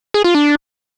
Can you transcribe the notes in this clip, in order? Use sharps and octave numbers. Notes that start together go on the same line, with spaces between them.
G#4
F4
D4